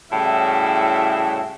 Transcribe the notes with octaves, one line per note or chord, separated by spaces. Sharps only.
A2 C#3 G3 E4 F#4 E5